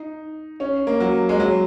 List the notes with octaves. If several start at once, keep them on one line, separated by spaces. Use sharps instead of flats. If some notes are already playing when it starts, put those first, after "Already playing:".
Already playing: D#4
C#4
A#3
F#3
G#3
F#3